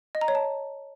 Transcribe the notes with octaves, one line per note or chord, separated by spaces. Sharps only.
D#5
A#5
C#5
A5